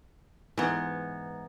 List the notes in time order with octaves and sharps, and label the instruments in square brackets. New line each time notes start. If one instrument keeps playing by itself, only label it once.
[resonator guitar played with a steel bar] G#2 B3 [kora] E3